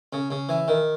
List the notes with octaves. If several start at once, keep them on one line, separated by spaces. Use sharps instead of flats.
C#3
C#3
E3
D#3